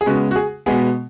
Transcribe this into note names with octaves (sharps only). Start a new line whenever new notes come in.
G#4
C#3 G#3 B3 F#4
F#4
G#4
B2 G#3 B3 G#4